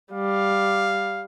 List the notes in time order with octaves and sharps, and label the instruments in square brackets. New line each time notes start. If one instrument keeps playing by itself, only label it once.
[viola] G3 [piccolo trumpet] F5